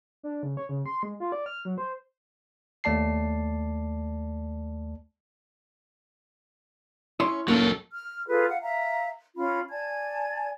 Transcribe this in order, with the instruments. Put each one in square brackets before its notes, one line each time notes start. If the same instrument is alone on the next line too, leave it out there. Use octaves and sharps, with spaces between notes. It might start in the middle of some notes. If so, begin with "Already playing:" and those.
[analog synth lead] D4
C#3
C#5
C#3
C6
G#3
F4
D5
F6
F#3
C5
[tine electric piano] D#2 A3 D5 A5 C7
[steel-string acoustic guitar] C#4 [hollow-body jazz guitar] E4 C#5 C6
[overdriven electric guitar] F#3 A4 [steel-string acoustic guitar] A#3 C#4
[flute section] F6
F4 G#4 A4 B4
F5 F#5
E5 F5 A#5
C#4 F4 B5
D5 G#5 A5 G#6